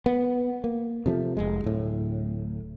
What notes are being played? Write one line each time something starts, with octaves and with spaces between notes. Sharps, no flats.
B3
A#3
C3 F3 G3 A3
F1 A#1 G#3
D1 A2